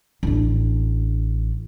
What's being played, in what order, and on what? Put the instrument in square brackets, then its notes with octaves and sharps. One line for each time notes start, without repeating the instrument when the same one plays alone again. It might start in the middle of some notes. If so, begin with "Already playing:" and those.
[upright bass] A1 D4